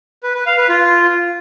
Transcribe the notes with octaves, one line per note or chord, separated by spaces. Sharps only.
B4
B4
F5
B4
F4